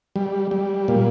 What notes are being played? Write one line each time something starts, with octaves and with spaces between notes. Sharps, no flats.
G3
G3
A#2